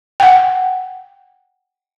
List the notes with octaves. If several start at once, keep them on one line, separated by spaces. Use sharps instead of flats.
F#5 G5